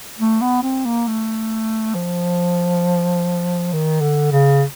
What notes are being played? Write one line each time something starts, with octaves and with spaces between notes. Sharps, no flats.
A3
B3
C4
A#3
A3
F3
D#3
D3
C#3